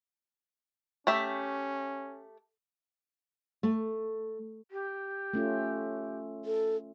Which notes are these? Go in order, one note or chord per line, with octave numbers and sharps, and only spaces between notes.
A3 C#4 G4 E5
A3
G4
A3 C#4 F4
A4